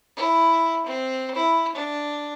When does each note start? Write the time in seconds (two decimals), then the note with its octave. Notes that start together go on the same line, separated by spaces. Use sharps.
0.17 E4
0.86 C4
1.35 E4
1.75 D4